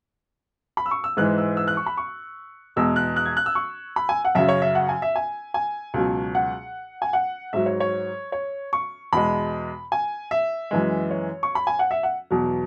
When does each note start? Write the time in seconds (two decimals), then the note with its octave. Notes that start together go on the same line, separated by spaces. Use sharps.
0.77 B5
0.86 E6
0.91 C#6
1.04 E6
1.17 G#2 E3 G#3 F#6
1.38 E6
1.57 E6
1.68 F#6
1.77 C#6
1.86 B5
1.97 C#6
2.76 E2 B2 G#3 E6
2.96 F#6
3.16 F#6
3.26 G#6
3.37 F#6
3.46 E6
3.55 C#6
3.96 B5
4.09 G#5
4.25 F#5
4.35 F#2 C#3 F#3 E5
4.49 C#5
4.62 E5
4.75 F#5
4.89 G#5
5.02 E5
5.16 G#5
5.54 G#5
5.94 C#2 B2 F#3
6.35 F#5
7.02 G#5
7.13 F#5
7.53 G#2 F#3 E5
7.66 C#5
7.80 C#5
8.32 C#5
8.73 C#6
9.13 E2 B2 G#3 B5
9.92 G#5
10.31 E5
10.71 F#2 E3 G#3
11.11 C#5
11.43 C#6
11.55 B5
11.67 G#5
11.79 F#5
11.91 E5
12.03 F#5
12.31 E2 B2 F#3